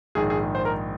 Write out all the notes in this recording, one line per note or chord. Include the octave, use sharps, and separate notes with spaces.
A#1 G#2 D#3 G#4
G#4
C5
A#4